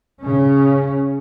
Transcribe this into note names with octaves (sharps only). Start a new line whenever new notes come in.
C#3 C#4